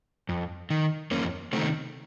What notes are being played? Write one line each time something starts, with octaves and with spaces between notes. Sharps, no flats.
F2
D#3
F2 A#3 C#4
C3 D#3 A3 C4